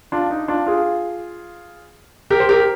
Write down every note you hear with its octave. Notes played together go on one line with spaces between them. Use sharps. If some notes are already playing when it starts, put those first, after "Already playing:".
D4 F4
D#4
D4 F4
F4 G#4
G4 A#4
C5
G4 A#4